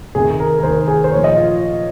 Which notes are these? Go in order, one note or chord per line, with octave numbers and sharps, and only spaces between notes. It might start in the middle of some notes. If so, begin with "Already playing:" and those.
C3 D#3 G#4
A#4
A#4
C3 D#3 C5
G#4
C5
A#2 F3 C#5
D#5
F4